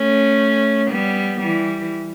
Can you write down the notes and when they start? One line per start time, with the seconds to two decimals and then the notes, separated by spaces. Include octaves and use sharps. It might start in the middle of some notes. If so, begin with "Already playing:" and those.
Already playing: A3 C#4
0.91 G3 B3
1.40 E3 G3